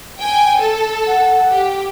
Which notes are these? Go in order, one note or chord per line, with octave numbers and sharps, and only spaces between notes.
G5 G#5
A4
F#5
G4